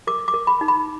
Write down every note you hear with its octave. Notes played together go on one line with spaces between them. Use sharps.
A#4 D6
D6
A#4
B5
D#4
B5